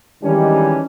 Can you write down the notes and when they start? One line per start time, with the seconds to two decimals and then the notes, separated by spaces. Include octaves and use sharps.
0.23 D#3 E3 G3 G#3 C#4 D4